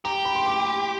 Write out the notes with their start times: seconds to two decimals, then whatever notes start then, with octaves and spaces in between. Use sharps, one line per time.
0.05 G4 A#5
0.25 B5
0.35 C6
0.46 D6